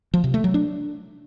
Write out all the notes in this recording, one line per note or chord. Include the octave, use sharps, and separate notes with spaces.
F3
C3
A3
F#3
D4